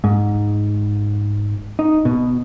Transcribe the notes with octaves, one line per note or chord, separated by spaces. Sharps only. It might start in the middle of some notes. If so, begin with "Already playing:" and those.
G#2
D#4
B2